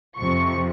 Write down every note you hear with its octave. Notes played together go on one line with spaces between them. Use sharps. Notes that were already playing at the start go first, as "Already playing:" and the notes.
F2 C3 F3 C#6